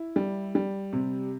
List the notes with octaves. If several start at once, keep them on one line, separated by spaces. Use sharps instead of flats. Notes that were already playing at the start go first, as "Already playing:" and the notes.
Already playing: E4
G3
G3
C3